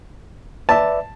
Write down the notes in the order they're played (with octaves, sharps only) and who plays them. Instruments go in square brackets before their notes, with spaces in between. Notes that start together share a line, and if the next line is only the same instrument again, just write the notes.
[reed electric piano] B4 D5 E5 [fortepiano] A5